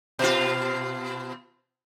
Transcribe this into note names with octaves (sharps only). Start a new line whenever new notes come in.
B2 F4